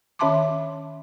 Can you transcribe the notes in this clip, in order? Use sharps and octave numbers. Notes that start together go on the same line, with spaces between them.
D#3 C#4 E5 A5 C6 D6